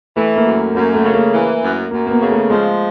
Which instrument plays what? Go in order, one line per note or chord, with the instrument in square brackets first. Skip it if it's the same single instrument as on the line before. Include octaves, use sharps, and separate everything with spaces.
[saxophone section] E3 [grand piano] A3
[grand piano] A#3
[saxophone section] F#2
[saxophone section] F#2 [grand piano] A#3
[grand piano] A3
[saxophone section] C#3
[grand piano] A#3
[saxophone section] E3
F#2
[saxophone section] F#2 [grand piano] A#3
[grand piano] A#3
B3
[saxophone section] C#3
[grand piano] A3
[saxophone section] F3 [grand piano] G#3